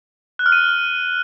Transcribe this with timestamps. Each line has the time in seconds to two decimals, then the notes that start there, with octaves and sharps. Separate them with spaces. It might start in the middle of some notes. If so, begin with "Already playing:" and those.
0.39 F#6
0.46 F6
0.52 D#7